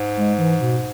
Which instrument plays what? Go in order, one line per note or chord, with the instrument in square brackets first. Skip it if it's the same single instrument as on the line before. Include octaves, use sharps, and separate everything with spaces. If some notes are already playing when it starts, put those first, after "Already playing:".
Already playing: [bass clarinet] G#2
[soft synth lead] G#3
E3
B2